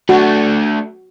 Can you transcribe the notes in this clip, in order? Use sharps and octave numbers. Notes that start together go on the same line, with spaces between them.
A3 D4 F#4